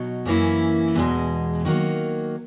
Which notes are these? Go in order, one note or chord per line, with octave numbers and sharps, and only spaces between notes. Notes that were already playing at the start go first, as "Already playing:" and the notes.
Already playing: B2 F#3 D#4
F#2 E3 A#3 C#4 E4
E2 B2 G#3
D#3 F#3 A#3